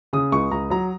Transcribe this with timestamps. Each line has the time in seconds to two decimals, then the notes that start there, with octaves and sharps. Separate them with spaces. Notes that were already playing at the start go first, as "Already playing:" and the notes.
0.13 C#3 D#6
0.32 C#2 C#6
0.51 C#2 A#5
0.70 F#3 A#5